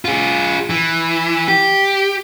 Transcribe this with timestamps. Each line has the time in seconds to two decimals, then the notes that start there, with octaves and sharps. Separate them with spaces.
0.05 F4 G#4
0.70 E3
1.48 G4